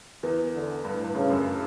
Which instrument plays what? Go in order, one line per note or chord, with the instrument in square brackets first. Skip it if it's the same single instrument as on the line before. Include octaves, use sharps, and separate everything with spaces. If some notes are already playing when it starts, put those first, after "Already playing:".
[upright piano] E2 E3
[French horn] D3
[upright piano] G2
A2
G2
[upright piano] G2 [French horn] C#3
[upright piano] F#2